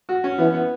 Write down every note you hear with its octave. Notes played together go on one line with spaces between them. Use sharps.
F#4
C#4
E3 B3
B3